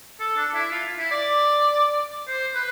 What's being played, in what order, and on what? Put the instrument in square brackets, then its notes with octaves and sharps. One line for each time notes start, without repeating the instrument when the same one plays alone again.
[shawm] A4
D4
E4
F4
E4
D5
C5
B4